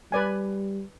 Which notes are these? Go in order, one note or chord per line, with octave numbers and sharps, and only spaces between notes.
G3 B4 D5 G#5